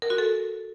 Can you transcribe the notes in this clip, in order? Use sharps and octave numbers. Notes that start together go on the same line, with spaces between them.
A#4
F#4
A4